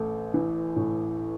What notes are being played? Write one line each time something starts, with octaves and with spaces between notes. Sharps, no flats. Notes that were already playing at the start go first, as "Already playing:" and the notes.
Already playing: A1 A3
E3
A2